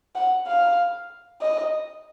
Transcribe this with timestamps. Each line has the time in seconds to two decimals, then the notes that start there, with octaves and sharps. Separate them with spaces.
0.15 F#5
0.47 F5
1.42 D#5